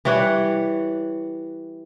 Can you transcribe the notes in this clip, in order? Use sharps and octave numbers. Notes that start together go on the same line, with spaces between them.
E3 G3 C#5 F#5